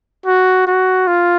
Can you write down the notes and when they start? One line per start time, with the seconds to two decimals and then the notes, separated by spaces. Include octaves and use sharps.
0.26 F#4
0.67 F#4
1.07 F4